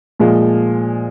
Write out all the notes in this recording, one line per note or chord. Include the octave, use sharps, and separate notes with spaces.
A#2 F3 G#3